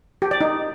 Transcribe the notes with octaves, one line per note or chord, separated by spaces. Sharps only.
G4
D5
D#4